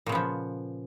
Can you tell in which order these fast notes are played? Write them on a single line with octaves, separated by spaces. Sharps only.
A#2 C#3 B3 F3